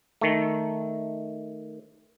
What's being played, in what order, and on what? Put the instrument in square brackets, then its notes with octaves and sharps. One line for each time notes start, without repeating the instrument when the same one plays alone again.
[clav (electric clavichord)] D#3 A3